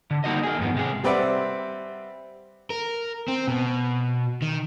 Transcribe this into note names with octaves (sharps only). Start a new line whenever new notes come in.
D3
G3 A#3 D#4 F#4 D#5
A#3 G#4
F2 G#2 B3
C3 G#3 G#4
G3 C4 B4 D5 E5 F#5
A#4
C4
B2
D#3